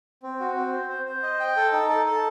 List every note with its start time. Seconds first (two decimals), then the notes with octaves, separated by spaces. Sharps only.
0.23 C4
0.40 F#4
0.55 C4
0.73 C5
0.89 C5
1.06 C5
1.23 D#5
1.40 G5
1.56 A4
1.73 D#4
1.89 A4
2.06 A4